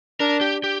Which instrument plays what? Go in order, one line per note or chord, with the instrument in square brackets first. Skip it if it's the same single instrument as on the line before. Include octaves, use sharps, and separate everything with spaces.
[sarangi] D4 [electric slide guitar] A#4
[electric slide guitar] G4
G4